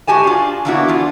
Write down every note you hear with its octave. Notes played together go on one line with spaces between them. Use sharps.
G#2 F#4 G4 G#5 A5
D4 F4
E3 A#3 B3 D4 E4 F#4
E3 F4